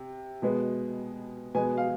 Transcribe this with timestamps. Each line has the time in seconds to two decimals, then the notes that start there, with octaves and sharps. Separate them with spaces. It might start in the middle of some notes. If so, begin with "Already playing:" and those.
Already playing: C3
0.42 B2 G#3 B3
1.55 B2 G#3 B3 G#5
1.77 F5